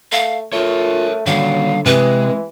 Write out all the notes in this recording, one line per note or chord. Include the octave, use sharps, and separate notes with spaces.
A3 F5
A3 F4 A#4 C#5
D3 D#3 F#3 G3 F5
C3 E3 G#3 B4